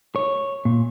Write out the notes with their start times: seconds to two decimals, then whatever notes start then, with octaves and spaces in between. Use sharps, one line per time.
0.16 C#5
0.65 A#2